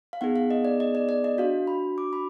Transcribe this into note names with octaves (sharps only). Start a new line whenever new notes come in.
F5
B3 D#4 G#4 F#5
F5
D#5
D5
D#5
D5
D5
D#5
D4 F#4 F5
B5
D6
B5